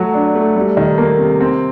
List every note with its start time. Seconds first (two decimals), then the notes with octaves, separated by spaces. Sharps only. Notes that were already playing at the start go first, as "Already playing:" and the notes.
Already playing: F#3 A3
0.14 D4
0.35 A3
0.56 G3
0.77 D#3
0.98 A#3
1.19 C3
1.41 C4